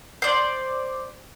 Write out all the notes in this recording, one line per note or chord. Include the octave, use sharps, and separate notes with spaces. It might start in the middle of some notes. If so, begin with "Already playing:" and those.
C5 D5